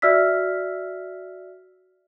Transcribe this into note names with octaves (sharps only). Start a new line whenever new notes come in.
F#4 D5 E5 E6 F6 B6